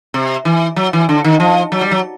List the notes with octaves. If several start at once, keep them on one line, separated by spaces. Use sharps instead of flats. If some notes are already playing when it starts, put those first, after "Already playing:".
C3
E3
F#3
E3
D3
D#3
F3
F#3
G3
F#3